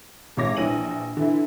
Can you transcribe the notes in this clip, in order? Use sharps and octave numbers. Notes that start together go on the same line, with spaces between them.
G#2 C3 F4 C#5 D6 A#6
A#1 E3 D#7 F#7
D3 E3 E4